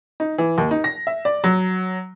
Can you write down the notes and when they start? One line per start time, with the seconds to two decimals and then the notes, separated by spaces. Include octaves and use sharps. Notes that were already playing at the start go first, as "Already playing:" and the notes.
0.20 D#4
0.38 E3
0.58 D#2
0.71 D#4
0.84 A#6
1.07 E5
1.25 D5
1.44 F#3